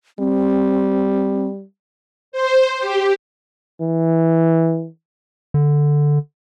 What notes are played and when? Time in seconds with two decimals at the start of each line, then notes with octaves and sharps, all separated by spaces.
0.19 G3 C4
2.32 C5
2.79 G4
3.80 E3
5.54 D3